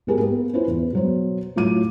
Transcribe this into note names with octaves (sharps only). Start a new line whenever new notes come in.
B1 G#2 G4 G#4 A#4
A#3 B3
C#4 E4 F4 B4 C5
E2
B2 F#3 C5
A2 F#3 F4 D6 D#7